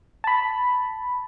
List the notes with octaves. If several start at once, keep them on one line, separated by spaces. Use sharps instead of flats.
A5 B5